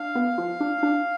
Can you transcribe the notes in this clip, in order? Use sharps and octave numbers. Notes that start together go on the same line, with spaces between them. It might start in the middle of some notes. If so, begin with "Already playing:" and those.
Already playing: D4 F5
B3
F3
D4
D4